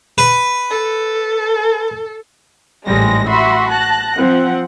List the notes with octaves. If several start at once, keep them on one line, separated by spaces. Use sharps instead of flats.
B4
A4
A1 G#2 G3 G#3 A#6
F#4 E5 B5 C6
A5 F#6 A#6
F3 C4 F#5